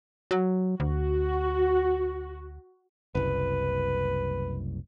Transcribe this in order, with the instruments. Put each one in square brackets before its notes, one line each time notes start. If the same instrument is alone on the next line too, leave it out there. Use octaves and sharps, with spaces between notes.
[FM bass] F#3
[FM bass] D2 [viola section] F#4
[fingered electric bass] F#1 C2 [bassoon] B4